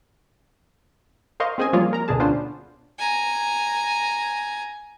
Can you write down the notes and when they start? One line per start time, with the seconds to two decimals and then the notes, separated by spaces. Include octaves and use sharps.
1.40 A#4 C5 D#5 F5 C6 C#6
1.58 C4 C#4 G#4 C5 D#5 G#5
1.73 F3 G3 A#3 F4 G#4 C#5
1.93 A#4 A#5
2.08 D2 B2 D4 G#4 A5
2.20 B3 C#4 D4 F4 C5
2.99 G#5 A#5